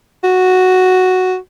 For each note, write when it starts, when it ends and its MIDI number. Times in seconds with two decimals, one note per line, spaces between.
0.24 1.36 66